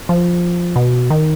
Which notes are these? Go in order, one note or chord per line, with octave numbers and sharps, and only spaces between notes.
F3
B2
D#3